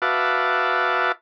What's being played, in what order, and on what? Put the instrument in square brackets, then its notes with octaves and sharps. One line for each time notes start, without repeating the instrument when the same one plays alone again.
[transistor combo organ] F#4 B4 E5 F5 A5 D6